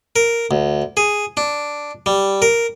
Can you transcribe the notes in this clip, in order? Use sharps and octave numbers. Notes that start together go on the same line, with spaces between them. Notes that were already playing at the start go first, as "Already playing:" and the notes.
A#4
D2
G#4
D4
G3
A#4